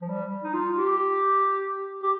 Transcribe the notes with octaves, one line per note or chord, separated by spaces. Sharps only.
F3
G3
D#4
F4
G4
G4